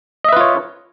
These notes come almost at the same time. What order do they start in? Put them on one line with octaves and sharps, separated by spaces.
D#5 E5 B4 F4 C#5